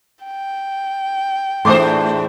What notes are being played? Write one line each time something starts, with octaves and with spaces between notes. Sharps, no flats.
G5
E2 A2 A3 D4 C5 C6 D6 D#6